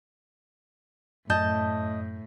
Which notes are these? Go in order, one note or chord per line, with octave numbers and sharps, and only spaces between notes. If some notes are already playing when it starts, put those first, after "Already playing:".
F#2 A2 D#5 A5 G6